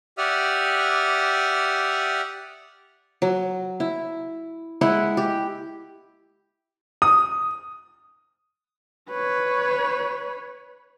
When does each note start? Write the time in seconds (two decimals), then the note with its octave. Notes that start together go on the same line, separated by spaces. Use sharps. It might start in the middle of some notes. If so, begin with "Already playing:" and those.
0.18 G4 D5 E5 F#5 D#6 F6
3.22 F#3
3.80 E4
4.81 G#3 E4 F#5
5.17 G4
7.02 D#6
9.10 B4 C#5